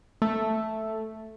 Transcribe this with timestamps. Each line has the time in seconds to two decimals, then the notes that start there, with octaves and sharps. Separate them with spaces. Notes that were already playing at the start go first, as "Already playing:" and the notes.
0.22 A3